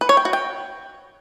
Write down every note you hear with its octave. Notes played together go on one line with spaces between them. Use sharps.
B4
C#5
G5
F#4
G5